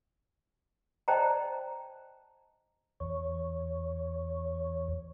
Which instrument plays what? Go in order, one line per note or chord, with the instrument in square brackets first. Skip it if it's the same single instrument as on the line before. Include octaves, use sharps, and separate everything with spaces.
[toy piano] C5 D5 D#5 G5 A5 A#5
[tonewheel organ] E2 C#5